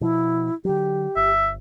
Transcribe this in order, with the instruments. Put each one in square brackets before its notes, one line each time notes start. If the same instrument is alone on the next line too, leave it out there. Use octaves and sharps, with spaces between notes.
[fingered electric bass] B2 F3 [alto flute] E4
[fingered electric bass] D3 F#3 [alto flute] G4
[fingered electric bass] G1 [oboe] E5